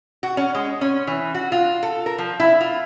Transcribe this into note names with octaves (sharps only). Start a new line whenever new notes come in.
F#4
C#4
G#3
C#4
E3
F#4
F4
A4
A#4
F3
E4
F4